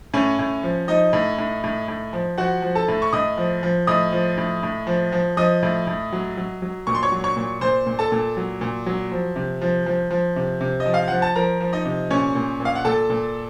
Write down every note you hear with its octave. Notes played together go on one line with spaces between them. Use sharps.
A2 C#4 C#5
A2
F3
F3 D#4 D#5
A2
A2
A2
A2
F3
F3 F#4 F#5
F3
A4 A5
A2
C#6
A2 D#5 D#6
F3
F3
A2 D#5 D#6
F3
A2
A2
F3
F3
F3 D#5 D#6
A2
A2
F#3
F#3
F#3
A#2 C#6
C6
C#5 C#6
F#3
C#5 C#6
A#2
A#2 C5 C6
A#2
A4 A5
A#2
F#3
A#2
F#3
F3
C3
F3
F3
F3
C3
C3
D#5
F3
F5
F3 F#5
A5
F3 A#4 A#5
F3
D#4 D#5
C3
A#2 C#4 C#5
A#2
A#2
F5
F#5
A#2 A4 A5
A#2